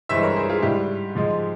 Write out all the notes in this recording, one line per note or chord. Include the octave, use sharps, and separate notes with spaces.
G2 E3 G#3 C5 E5
A#4 C#5
G#4 C5
F4 G#4
G#2 G3 E4 G4
G#2 F3 G#3